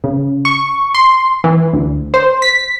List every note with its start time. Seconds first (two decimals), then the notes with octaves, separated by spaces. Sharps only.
0.04 C#3
0.45 C#6
0.94 C6
1.44 E3
1.73 D2
2.14 C5
2.42 B6